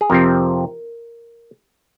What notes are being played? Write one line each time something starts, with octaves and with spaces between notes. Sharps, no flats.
G#4
F2 C3 F3 C4 A#4